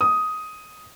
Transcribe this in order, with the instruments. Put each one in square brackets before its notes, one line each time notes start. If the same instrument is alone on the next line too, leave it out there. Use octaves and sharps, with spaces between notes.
[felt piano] D#6